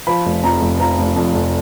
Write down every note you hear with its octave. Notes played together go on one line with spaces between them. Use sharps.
F3 B5
F1
F2 A#5
F1
F3 A#5
F1
F2
F1